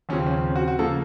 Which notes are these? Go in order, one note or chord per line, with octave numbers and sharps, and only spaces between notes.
D#2 C#3 F3 C4 C#4
C#4
F#4
F#4
C#3 F3 A#3 A4